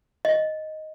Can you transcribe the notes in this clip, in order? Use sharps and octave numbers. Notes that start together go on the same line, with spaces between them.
D#5